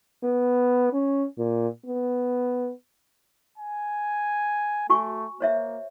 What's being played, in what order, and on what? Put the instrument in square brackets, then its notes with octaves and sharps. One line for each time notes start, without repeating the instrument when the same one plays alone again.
[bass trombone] B3
C#4
A#2
B3
[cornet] G#5
[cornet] A3 [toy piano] F#4 G#5 C#6
[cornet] A#3 [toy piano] C5 C#5 E5